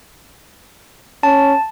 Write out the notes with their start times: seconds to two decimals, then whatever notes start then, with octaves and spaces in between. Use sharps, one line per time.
1.23 C#4 A5